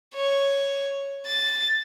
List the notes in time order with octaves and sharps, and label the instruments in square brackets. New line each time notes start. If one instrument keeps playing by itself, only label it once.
[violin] C#5
A6